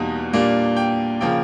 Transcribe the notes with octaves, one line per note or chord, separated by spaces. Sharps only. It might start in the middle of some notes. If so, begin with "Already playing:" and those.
Already playing: E2 B2 G3 A#3 D#4
A#2 G3 A#3 D4
G5
C#3 F3 A#3 G5